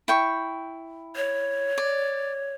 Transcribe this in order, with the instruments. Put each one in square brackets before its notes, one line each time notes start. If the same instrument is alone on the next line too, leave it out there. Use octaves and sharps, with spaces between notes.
[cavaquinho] E4 G5 C#6
[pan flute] C#5
[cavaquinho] D5